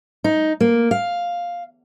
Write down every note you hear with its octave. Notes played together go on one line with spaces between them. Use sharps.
D#4
A#3
F5